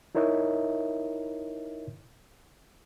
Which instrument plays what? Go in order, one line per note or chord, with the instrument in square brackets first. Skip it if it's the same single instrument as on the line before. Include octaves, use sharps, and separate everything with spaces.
[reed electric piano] D#4 E4 A#4 C#5 D#5 E5